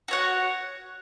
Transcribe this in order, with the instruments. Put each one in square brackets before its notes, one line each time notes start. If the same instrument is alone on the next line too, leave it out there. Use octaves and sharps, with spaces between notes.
[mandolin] F#4 C#5 F#5